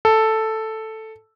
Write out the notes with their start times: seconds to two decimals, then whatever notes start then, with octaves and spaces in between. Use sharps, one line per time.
0.05 A4